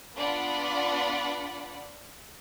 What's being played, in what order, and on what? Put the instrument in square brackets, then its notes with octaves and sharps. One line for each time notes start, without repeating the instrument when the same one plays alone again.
[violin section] B3 D4 F4 D5 F#5 B5